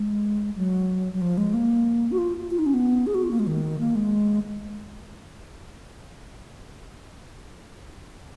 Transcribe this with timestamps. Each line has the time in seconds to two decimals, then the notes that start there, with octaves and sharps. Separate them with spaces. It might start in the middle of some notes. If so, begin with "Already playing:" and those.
Already playing: G#3
0.56 F#3
1.13 F#3
1.21 F3
1.38 G#3
1.54 A#3
2.11 F#4
2.18 F4
2.50 F4
2.59 D#4
2.66 C#4
2.74 B3
3.06 G#4
3.14 F#4
3.23 F4
3.31 A#3
3.39 G#3
3.47 D#3
3.79 A#3
3.95 G#3